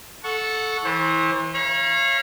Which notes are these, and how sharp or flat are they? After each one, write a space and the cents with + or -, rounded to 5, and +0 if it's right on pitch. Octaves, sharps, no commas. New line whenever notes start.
A4 -10 F#5 -20 C#6 +0
E3 -20 C5 +35
C#5 -25 F5 -30 A#5 +40